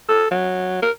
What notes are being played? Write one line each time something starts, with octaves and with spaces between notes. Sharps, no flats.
A4
F#3
A#4